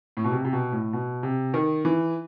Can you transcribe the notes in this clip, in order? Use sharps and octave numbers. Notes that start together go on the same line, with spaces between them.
A2
B2
C3
C3
B2
A2
B2
C3
D#3
E3